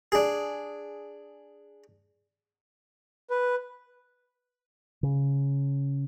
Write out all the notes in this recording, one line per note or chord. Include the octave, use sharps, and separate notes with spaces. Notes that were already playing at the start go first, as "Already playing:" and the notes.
D4 G#4
B4
C#3